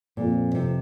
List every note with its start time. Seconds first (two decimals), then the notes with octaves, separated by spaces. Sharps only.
0.17 F2 A#2
0.55 C3